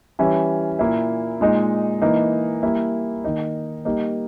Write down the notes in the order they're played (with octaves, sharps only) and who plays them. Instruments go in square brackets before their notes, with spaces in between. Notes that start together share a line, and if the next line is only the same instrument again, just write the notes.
[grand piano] E3 G3 C#4 E4
A#2 A#3 E4
A#2 G#3 D#4
E3 A#3 D#4
G3 A#3 E4
D#3 A#3 D#4
G3 A#3 D#4